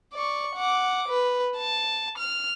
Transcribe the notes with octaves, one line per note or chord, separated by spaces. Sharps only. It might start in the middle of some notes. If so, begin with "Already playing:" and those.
D5 C#6
F#5 D6
B4
A5
F6